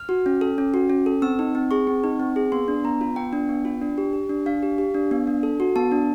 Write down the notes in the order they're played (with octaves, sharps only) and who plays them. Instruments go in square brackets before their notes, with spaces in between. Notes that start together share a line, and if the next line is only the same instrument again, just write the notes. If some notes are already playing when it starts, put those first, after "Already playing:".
Already playing: [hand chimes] F6
F#4
C#4
A4
C#4
F#4
C#4
A4
C4 E6
D#4
C4
G#4 C#6
C4
D#4
C4
G#4
B3 C6
D4
B3 A#5
F4
B3 G5
D4
B3
F4
D4
G4
G4
D4
D4 F5
G4
G4
D4
B3
D4
A4
F#4
B3 A5
D4